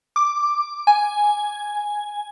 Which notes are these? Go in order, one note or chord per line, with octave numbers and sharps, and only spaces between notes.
D6
G#5